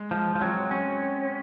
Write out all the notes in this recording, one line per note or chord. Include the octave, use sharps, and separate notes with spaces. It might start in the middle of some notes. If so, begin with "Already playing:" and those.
Already playing: G#3
F3 G#3
F3
F#3 C4
C#4 F#4
C4